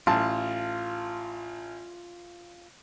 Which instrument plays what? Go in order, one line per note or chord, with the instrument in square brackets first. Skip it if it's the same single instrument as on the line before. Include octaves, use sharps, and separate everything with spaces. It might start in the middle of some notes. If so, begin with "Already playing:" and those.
[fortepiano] A1 A5 [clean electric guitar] F4